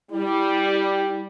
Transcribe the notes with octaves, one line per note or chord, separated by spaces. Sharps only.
G3 E4